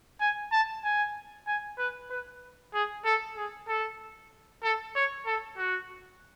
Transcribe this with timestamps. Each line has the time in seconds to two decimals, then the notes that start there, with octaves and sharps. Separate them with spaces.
0.20 G#5
0.52 A5
0.84 G#5
1.47 G#5
1.78 B4
2.10 B4
2.74 G#4
3.05 A4
3.37 G#4
3.68 A4
4.63 A4
4.95 C#5
5.26 A4
5.57 F#4